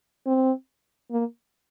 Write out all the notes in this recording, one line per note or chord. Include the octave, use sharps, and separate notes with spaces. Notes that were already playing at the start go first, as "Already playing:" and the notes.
C4
A#3